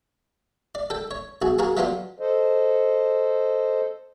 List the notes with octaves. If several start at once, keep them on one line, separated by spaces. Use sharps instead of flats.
D5
A4 G5
C#5
B1 F#4 G#4
A#3 F#4 G#4 A#4
F#3 A3 B3 D4 F4 C5
A4 C5 D#5